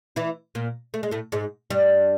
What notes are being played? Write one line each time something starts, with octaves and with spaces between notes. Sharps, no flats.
E3 E4
A#2 A#3
A3
G#3
A2 A3
G#2 G#3
G2 G3